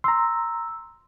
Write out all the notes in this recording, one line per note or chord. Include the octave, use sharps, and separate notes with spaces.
A#5 C6 E6